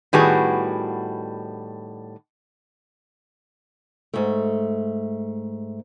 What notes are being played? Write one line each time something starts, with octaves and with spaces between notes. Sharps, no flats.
A2 D#3 G3 B3 F#4 G#4
G#2 A3